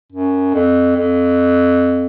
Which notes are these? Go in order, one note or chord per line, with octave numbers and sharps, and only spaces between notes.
F#2
F2
F2